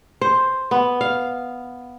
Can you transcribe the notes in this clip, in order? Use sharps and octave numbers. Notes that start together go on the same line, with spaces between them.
C5
B3
F5